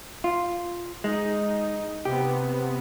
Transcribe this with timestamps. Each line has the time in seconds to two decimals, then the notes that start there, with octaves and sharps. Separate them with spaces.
0.24 F4
1.04 G#3 D#4
2.05 C3 B3 G4